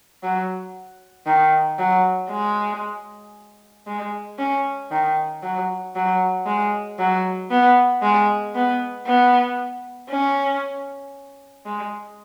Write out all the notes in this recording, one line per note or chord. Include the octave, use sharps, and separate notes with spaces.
F#3
D#3
F#3
G#3
G#3
C#4
D#3
F#3
F#3
G#3
F#3
B3
G#3
B3
B3
C#4
G#3